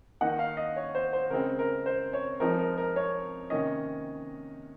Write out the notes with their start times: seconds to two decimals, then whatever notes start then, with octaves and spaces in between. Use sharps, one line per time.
0.21 D#3 A#3 D#4 F#5
0.39 F5
0.57 D#5
0.76 C#5
0.95 C5
1.13 C5
1.30 C#3 G#3 C4 A#4
1.59 A#4
1.86 C5
2.13 C#5
2.40 F3 G#3 C4 D#4 A#4
2.59 A#4
2.78 A#4
2.96 C#5
3.50 C3 D#3 A#3 C#4 D#5